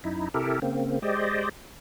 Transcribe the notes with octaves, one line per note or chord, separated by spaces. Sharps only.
F#2 D#4 E4
C3 E4 G4 A4 A#4
C#3 A#3 C4
G#3 G4 C5 D5 D#5